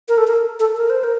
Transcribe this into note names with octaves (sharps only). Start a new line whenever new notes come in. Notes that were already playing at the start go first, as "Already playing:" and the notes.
A#4
A4
A#4
A4
A#4
C5
A#4